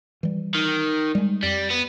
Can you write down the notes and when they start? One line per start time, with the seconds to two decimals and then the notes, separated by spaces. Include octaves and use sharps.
0.23 E3 G3
0.54 D#3
1.15 G3 G#3
1.43 F2 G3
1.70 B3